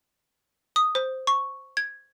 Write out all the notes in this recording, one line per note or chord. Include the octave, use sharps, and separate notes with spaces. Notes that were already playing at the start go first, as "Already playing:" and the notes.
D#6
C5
C#6
G#6